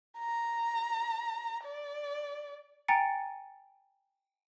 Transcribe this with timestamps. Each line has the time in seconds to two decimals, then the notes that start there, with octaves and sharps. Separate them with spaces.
0.19 A#5
1.64 D5
2.88 G5 G#5 A#5 A6 C#7 D7